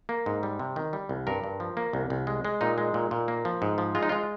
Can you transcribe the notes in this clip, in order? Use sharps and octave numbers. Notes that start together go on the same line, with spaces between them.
A#3
G#2
G3
C3
D#3
G3
C2
G2 A#4
G2
F3
A#3
C2
C2
G#3
G#3
A#2 D#4
G#3
A#2
A#2
A#3
F3
G#2
F3
G#3 F4
D#4
G#3 F4